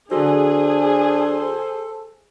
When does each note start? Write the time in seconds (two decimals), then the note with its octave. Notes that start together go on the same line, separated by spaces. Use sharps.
0.11 D3 F#3 D4 G#4 A4 C5